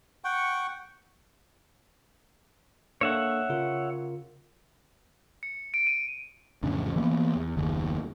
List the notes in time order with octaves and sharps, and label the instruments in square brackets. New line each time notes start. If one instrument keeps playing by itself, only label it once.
[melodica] F#5 G5 C#6
[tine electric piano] A#3 D4 A4 [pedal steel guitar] C#5 E5 F#5
[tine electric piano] C#3 F4 A#4
[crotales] C#7
D7
D#7
[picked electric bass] A1 F2 C#3 D4
E3 A#3 B3
E2
F#1 D#2